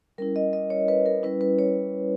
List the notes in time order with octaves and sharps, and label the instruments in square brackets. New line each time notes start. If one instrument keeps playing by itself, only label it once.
[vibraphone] G3 C#4 E4 A#4
D#5
D#5
C#5
B4
A#4
G3 C#4 E4 B4
B4
C#5